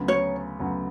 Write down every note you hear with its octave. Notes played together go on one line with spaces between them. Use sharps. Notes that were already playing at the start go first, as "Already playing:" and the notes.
Already playing: D2 C#3 F#3 B3
C#5
D2 C#3 F#3 B3